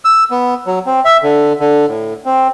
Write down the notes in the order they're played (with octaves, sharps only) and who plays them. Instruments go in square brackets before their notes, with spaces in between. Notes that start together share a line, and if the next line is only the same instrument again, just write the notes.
[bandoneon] E6
B3
F#3
C4
E5
D3
D3
A2
C4